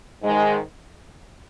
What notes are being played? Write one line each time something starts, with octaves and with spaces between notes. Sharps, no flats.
G#2 D#3 G#3